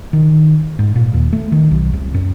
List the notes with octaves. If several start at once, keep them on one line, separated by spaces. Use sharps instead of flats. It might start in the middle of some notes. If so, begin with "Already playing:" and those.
D#3
G#2
A#2
D#2
A3
D#3
B1
C2
F#2